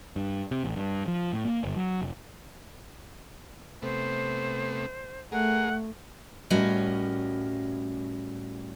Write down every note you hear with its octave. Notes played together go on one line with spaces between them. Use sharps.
G2
C3
A1
G2
F3
A2
A#3
G1
F#3
F1
C3 A3 B3 C5
A3 G#4 A#4 F#5
A2 G3 C#4 F#4 A#4 D#5